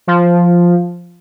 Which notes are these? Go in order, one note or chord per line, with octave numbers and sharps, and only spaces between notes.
F3